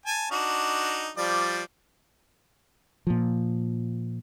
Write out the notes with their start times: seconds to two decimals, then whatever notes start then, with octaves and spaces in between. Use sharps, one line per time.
0.06 G#5 A5
0.31 D4 D#4 F#4
1.17 F3 G3 D5
3.07 A#2 F3